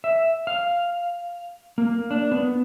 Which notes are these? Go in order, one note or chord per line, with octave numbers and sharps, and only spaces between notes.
E5
F5
A#3
D4
B3